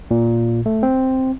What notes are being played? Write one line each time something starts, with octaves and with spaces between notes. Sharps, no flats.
A#2
A3
C4